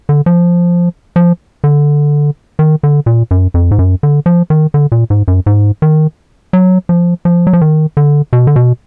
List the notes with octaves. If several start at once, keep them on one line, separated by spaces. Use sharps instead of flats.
D3
F3
F3
D3
D#3
D3
A#2
F#2
F2
G#2
F#2
D3
F3
D#3
D3
A#2
G#2
F#2
G#2
D#3
F#3
F3
F3
F#3
F3
D#3
D3
B2
D3
B2